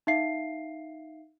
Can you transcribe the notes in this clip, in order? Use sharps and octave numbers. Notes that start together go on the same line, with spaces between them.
D#4 E5 F5 C7